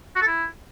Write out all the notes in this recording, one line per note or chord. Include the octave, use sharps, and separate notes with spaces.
F#4
A4
E4